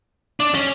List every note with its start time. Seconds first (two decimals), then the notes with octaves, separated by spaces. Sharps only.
0.40 D4
0.54 C#4